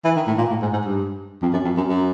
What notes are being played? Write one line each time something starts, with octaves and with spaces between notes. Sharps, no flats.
E3
D#3
A2
A#2
A2
G#2
G#2
G2
F2
F#2
F2
F#2
F#2